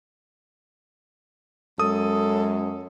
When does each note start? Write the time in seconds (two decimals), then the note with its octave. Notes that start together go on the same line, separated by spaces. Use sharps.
1.79 F#2 G#3 A4 D#6